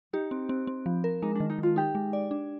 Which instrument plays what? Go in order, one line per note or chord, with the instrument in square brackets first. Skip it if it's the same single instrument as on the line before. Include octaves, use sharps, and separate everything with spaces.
[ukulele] D#4 [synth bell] G4
[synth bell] C4
C4
C4
F3
A#4
[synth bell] G#3 [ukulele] D#4
[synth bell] D#3 [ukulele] D4
[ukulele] D#4
[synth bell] D#3 [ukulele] F4
[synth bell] D#4 [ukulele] G4
[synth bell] G#3
D5
D4